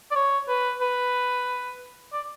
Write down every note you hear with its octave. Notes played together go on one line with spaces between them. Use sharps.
D5
C#5
B4
B4
D5